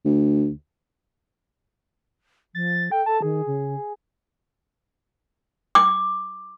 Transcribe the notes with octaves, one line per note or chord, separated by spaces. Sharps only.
D2
F3 A6
A4 G5
A4 A5
D#3 G#4
C#3
D6